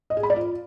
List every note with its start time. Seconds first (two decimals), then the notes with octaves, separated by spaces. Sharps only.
0.10 D#5
0.17 G#4
0.23 B5
0.30 D5
0.36 F4